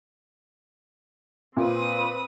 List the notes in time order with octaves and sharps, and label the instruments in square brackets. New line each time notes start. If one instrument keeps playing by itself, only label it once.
[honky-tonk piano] A#2 [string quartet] C4 B4 D#6